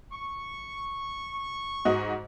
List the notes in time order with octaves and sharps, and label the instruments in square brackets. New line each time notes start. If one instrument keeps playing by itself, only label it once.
[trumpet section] C#6
[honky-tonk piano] G#2 F#4 D#5